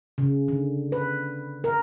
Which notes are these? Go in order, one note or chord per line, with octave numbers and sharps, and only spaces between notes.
C#3
D3
B4
A#4